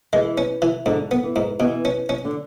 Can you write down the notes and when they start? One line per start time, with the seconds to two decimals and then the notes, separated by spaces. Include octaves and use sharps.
0.13 E3 G#3
0.38 C#4
0.62 E3
0.86 G#2 D3
1.11 B3
1.23 E3
1.36 G#2
1.60 B2 E3
1.85 C#4
2.09 C#4
2.25 D3